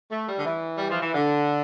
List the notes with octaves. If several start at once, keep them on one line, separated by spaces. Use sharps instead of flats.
A3
G3
D3
E3
G3
F3
E3
D3